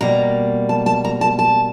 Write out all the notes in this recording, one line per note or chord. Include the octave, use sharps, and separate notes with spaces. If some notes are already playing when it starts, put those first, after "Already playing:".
B2 G3 A#3 A#5
A5
A5
A#5
A5
A5